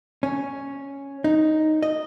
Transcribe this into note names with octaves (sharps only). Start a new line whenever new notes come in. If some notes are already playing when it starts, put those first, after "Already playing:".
C#4
D#4
D#5